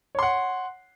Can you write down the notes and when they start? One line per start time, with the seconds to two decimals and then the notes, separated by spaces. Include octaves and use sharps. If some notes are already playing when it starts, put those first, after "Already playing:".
0.15 C#5
0.19 C6
0.23 F#5